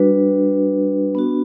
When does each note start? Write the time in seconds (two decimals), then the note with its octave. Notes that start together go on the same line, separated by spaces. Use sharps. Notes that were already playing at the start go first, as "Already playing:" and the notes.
Already playing: G3 D4 F#4 B4
1.15 B3 D4 F#4